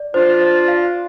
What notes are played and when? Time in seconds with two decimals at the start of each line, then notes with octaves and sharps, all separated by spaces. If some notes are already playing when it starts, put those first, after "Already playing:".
Already playing: D5
0.14 D4 F4 C5
0.41 C5
0.68 F5